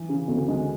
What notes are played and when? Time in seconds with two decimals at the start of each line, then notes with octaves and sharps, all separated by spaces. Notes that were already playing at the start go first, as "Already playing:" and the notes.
Already playing: E3
0.09 C#3
0.28 D2
0.48 G#3